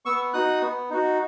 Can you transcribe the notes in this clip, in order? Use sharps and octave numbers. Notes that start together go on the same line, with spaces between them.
B3 C#6 E6
D#4 F#4 D#6 F#6
B3
D#4 F#4